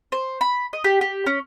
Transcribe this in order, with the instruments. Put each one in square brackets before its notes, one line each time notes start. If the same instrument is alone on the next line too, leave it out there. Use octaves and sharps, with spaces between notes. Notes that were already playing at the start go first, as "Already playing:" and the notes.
[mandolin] C5
B5
D#5
G4
G4
C#4